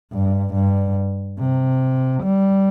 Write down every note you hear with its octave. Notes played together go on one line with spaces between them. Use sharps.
G2
G2
C3
G3